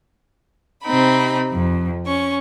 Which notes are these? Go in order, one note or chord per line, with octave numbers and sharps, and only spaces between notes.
C3 C4 D#4 B5
F2
C#4 C#6